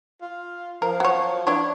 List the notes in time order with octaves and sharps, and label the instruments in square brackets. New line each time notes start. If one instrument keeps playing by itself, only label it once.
[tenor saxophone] F4
[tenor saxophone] F3 [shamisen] A#4
[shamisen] F#3 C#5
[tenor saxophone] D4 [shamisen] E4 B4 C#5